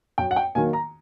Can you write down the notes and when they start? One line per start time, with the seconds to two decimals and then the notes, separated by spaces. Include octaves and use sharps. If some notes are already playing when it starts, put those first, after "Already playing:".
0.18 F#2 G5
0.31 F#5
0.36 G5
0.55 D#3 F#3 A#3 G#5
0.73 A#5